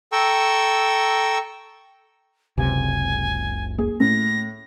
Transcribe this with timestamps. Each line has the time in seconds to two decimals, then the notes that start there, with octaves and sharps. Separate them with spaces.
0.12 A4 G5 A#5 C#6 E6
2.58 F#1 C#2 C3 G#5
3.78 A#3 G#4
4.00 A2 A#6